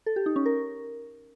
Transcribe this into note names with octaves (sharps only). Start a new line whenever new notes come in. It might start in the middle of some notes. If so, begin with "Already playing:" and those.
A4
G4
D#4
C#4
A#4